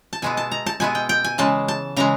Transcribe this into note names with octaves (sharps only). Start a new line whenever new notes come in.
A5
B2 G#3 B3 E4 G#5
A5
A#5
A5
B2 G#3 B3 E4 G#5
G5
G5
G#5
C#3 E3 G#3 A5
A5
C#3 E3 G#3 A#5